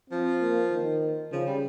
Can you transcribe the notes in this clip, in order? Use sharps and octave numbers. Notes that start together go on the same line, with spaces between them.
F3 C4
A#3
D#3
C#3 F3
G3